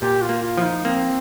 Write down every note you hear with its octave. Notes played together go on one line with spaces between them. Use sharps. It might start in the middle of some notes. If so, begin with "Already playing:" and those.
A#2 G4
F4
A#3
F4
F3
D#4
A#3 C4